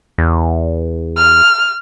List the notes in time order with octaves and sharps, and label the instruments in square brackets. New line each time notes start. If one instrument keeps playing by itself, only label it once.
[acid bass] E2
[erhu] F6